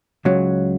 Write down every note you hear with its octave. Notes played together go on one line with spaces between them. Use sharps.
C#2 C#3 F#3